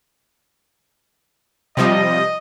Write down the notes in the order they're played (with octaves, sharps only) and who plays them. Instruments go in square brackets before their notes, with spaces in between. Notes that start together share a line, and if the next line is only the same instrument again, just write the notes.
[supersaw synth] C3 F3 G3 [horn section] D#5